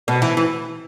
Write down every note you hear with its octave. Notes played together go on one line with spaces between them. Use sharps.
B2
E3
E3